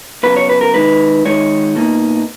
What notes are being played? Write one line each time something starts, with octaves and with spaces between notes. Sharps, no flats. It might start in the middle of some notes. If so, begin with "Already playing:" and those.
C#3 F#3 B3 B4
C#5
B4
A#4
D#3 G#3 D#4 B4
D#3 G#3 D#4 C#5
B2 A#3 D#4